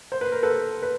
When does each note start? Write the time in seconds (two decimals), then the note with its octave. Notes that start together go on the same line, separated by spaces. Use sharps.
0.12 C5
0.21 B4
0.32 A#4
0.43 A4 B4
0.82 B4